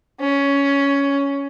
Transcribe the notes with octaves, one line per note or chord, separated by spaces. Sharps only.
C#4